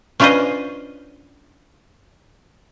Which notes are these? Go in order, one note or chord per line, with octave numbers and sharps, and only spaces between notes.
C#4 D4 F4 B4 C5 D#5